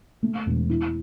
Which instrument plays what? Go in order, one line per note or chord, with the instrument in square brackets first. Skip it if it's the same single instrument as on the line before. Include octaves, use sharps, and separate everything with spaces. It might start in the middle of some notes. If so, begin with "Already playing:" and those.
[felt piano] A3
E1
E4